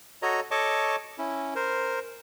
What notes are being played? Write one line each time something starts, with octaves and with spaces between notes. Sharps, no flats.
F#4 A4 C#5 D#5 A#5
A4 C#5 D#5 A5 C#6 D6
C#4 E4
A#4 C5